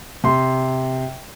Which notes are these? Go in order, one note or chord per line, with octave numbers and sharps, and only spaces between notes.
C3 C6